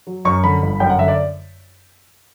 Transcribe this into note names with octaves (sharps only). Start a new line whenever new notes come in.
F#3
F#2 C#6
D3 B5
G1
F#2 G5
F#5
D3 E5
D5